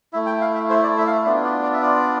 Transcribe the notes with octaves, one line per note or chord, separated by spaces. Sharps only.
A3 E4 E5
G5
F5
E5
C5
D5
E5
F5
E5
B3 D4 F4 D5
D5
D5
E5
D5